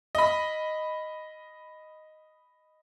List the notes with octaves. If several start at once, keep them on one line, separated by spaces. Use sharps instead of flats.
D#5 B5